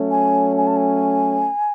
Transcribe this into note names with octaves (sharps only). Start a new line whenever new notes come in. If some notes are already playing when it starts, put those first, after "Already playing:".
Already playing: F#3 A3 C#4
G#5
G#5
A5
G#5